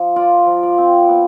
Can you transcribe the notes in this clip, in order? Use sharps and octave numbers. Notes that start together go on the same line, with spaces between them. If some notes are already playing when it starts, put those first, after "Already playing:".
Already playing: F3
F4 D5
F3
D5
C4
B3